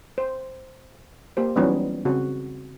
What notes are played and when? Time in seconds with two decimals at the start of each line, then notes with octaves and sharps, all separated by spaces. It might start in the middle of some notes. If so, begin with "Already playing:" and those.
0.18 C5
1.37 A#3 G4 C5
1.56 E3 F#3 G3 B3 C#4 D#4
2.05 C#3 C4 F#4